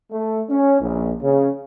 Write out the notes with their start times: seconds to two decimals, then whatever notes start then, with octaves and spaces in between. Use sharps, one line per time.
0.11 A3
0.49 C#4
0.80 A#1
1.22 C#3